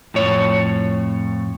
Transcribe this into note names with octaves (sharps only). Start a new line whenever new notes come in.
F2 A2 C#5